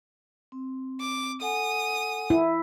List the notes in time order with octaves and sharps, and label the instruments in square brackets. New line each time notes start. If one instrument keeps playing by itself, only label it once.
[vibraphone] C4
[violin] D6
[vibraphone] A4 F#5 G#5 [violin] D#6
[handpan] E4